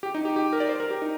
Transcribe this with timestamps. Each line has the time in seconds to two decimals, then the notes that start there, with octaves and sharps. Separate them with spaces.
0.03 G4
0.14 D#4
0.25 G4
0.36 G4
0.53 A#4
0.60 D5
0.69 C5
0.80 A#4
0.91 G4
1.02 D#4